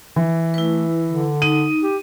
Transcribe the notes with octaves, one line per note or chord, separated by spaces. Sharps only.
E3
A3 E4 B4
D3
D#4 D#7
G4